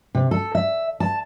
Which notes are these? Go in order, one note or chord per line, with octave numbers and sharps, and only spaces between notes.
C3
A4
E5
A5